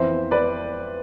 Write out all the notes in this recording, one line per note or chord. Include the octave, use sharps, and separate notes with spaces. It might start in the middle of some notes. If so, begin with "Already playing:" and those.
Already playing: F2 E3 B3 C5 E5
B4 D5